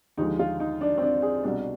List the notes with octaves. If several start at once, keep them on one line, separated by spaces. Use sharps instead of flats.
D#2 D3 F3 G#3 D#4
F4
D#4
D4
C4
D4
G#4
C2 B2 G3 D4